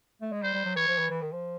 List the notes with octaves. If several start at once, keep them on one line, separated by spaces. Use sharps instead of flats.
A3
G#3
G3 C5
G3
F#3
E3 C#5
F3
E3
E3
D#3
F3